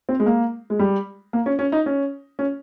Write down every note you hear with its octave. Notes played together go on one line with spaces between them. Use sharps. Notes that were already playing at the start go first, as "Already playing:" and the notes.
C4
G#3
A#3
G#3
G3
A#3
C#4
C#4
D#4
C#4
C#4